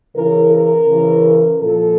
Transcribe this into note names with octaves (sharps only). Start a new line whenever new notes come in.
C#3 E3 A#4
A#4
C#3 E3
A#2 F3 A4